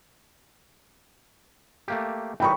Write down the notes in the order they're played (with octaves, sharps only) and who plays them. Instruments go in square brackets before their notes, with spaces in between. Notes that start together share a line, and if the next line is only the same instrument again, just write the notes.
[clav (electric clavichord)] A3 A#3 G4
[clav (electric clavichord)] E3 G3 D#4 [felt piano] G5 B5 C#6